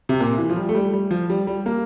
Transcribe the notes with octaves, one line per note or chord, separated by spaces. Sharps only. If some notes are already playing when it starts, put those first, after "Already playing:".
C3
A#2
E3
F3
G3
A3
G3
G3
F3
G3
G3
A#3